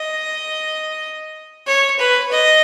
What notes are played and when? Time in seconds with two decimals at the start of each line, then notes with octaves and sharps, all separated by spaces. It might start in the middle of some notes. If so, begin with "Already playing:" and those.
Already playing: D#5
1.67 C#5
1.99 B4
2.32 D#5